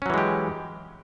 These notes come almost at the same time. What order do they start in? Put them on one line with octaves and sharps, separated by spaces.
C#4 F#3 E3 G#3 G4